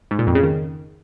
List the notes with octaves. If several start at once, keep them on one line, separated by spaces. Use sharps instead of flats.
G#2
A#2
F2
C#3
D#3